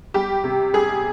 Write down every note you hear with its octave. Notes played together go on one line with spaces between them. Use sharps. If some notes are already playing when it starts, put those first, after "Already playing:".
G3 G4
C3
G3 G#4